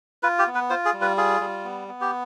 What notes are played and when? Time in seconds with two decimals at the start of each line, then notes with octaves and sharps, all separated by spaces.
0.23 F4 B4
0.39 G4
0.47 B3
0.55 B4
0.70 F4 C5
0.85 G#4
0.94 G3
1.01 B4
1.17 F4 G#4
1.40 G3
1.64 B3
1.88 B3
2.01 G4